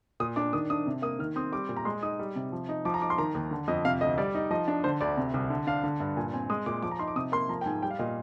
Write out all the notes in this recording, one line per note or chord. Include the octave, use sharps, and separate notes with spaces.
A#2 D#6
D4 D6
D#3 D#6
D4 D#6
C3
A#3 D#6
D#3 F6
C4 D#6
G3 D6
A#2
A#5
G#3 C6
D#4 D#6
G3
C3
F3
D#4
F3 D6
A#5
D#4 D6
C6
D#3 A#5
D#2
D3
F2 D#5
C3 F5
D2 D#5
G3 D5
D#4
F3 D#5
D4
D3 C5
D2 D5
C3
C2
D3
D4 F5
D3
G2
A#2 G#5
C4 G#5
G#3 D#6
A#2 D6
F3 D6
A#5
D#4 C6
D6
C3 D#6
A#3 C6
F3 A#5
G5
G#2 G#5
G3 G5
F5
A#2 D#5